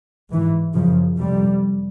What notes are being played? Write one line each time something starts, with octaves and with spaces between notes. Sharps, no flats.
G#2 E3
F#2 C#3 F3
F2 C3 G3